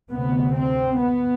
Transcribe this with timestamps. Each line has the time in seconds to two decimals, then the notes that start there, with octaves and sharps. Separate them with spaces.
0.12 D2 C3 B3
0.56 C4
1.00 B3